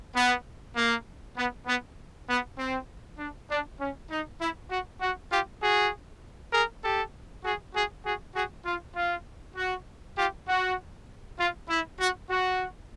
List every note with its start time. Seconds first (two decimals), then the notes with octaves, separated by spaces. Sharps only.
0.15 B3
0.76 A#3
1.36 B3
1.66 B3
2.28 B3
2.58 C4
3.18 D4
3.49 D4
3.80 C#4
4.10 D#4
4.40 E4
4.70 F#4
5.01 F#4
5.31 F4 G4
5.61 F#4 G#4
6.52 G#4 A#4
6.83 G4 A4
7.43 F#4 G#4
7.74 F#4 G#4
8.04 F#4 G#4
8.35 F#4 G#4
8.65 F4
8.95 F4
9.56 F#4
10.16 F4 G4
10.47 F#4
11.38 F4
11.69 E4
11.99 F#4
12.29 F#4